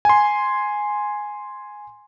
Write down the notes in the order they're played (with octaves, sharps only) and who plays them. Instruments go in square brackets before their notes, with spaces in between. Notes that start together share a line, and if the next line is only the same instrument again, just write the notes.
[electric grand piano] G#5 C6